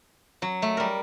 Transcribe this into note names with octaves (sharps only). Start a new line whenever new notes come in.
F#3
A3
G3 A#4